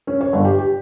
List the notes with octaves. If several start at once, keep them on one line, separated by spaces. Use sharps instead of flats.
C#4
C#5
G1
G4
G4